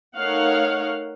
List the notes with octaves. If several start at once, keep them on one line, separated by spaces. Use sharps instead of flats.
A3 D#4 A#4 C#5 F5 F#5